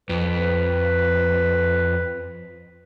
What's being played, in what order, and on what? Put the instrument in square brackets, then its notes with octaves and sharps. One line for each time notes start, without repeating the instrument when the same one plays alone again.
[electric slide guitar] F2 [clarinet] B4